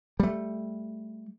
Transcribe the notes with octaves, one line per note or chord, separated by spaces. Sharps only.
G3 A3